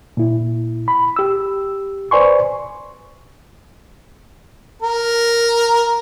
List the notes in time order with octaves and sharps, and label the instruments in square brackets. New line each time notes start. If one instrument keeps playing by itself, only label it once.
[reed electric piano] A#2 E4
B5
G4 E6
B4 C5 D5 G#5 C6 C#6
[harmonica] A#4